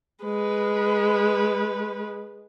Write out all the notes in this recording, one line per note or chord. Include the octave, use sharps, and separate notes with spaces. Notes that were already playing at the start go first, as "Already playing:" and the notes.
G#3 B4